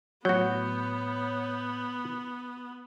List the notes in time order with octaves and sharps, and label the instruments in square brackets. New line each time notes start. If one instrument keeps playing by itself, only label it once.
[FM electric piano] A2 C#5 G6 [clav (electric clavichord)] F#3 F#4 [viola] B3